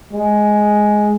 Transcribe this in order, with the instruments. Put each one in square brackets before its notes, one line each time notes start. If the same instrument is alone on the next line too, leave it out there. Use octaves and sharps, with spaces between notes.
[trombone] G#3